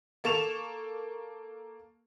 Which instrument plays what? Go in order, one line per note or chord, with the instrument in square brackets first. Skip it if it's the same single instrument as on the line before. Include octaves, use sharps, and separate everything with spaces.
[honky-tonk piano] A#3 A4 C#6 E7 F7